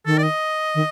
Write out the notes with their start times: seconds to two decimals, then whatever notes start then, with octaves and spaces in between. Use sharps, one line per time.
0.06 D#3 A4
0.18 D5
0.23 D#5
0.75 D#3